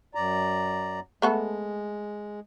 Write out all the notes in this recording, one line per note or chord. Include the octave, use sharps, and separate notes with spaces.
F#2 D5 A#5
G#3 A3 B3 A4